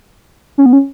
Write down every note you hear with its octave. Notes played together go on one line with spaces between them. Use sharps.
C#4
B3
C#4